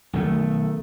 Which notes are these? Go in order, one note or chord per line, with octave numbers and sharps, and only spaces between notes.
B1 D#3 A3